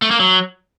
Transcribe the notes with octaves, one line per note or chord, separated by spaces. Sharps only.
A3
A#3
F#3